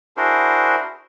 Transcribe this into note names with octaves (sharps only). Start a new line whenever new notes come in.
D4 E4 F#4 G#4 A#4 C5